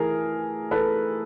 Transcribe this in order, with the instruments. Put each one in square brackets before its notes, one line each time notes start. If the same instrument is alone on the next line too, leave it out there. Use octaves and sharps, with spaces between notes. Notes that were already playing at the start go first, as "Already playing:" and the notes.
Already playing: [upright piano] E3 A3 G#4 A#4
A4 B4